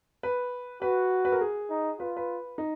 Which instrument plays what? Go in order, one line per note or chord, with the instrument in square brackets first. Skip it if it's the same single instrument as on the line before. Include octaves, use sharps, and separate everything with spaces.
[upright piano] B4
[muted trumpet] F#4 [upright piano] B4
[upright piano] B4
A#4
G#4
[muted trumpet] D#4
[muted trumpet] F4 [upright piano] B4
[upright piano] B4
D#4